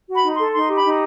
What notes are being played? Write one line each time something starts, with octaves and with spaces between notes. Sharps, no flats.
F#4
B5
D#4
C6
A4
D#4 C6
G4
B5
D#4